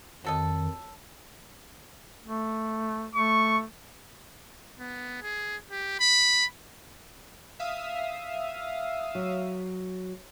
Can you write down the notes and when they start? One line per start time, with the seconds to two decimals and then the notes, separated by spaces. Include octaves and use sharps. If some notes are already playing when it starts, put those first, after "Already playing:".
0.24 F2 D#3 F#3 A4 D#5
2.25 A3
3.16 A3 C#6
4.79 B3
5.22 G#4
5.71 G4
6.00 B5
7.60 E5 F5 D#6
9.15 F#3